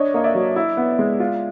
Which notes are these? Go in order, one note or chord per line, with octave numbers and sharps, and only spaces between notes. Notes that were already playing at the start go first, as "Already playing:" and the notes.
Already playing: D4 C#5 D#5
A#3 D#5
D5 E5
F#3
E4
B3
G#3
F4